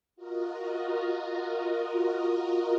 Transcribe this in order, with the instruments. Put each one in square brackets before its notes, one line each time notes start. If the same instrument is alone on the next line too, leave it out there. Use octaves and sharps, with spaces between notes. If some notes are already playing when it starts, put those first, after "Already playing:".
[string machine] F4 F#4 A#4 D#5